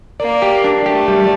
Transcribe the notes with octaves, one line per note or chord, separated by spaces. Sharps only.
A#3 D5
G4
D4
A3 G4
G3